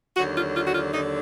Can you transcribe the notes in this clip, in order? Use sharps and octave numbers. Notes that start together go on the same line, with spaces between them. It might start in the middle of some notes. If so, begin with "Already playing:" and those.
D#2 D3 F#3 F#4
F4
F4
F#4
F4
D#2 D3 F#3 D#4